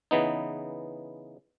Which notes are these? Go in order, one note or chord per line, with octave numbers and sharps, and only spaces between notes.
C#3 E3 B3 D#4